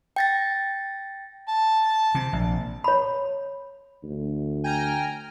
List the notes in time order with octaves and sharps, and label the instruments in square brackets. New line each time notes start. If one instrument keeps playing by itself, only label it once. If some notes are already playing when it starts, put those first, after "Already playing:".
[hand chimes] G5 A6 A#6
[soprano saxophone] A5
[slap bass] C3
A#1
[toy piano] C#5 B5
[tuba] D2
[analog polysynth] G5 A#5 F6 [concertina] G#5